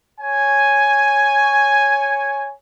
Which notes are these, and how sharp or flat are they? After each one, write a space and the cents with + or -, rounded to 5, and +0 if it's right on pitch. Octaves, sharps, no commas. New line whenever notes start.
C#5 +0 G#5 +0